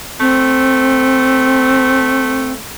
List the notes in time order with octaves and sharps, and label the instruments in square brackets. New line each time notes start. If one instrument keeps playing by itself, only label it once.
[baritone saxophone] A3 [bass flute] C4